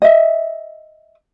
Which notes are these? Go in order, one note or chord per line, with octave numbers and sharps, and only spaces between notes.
D#5 E5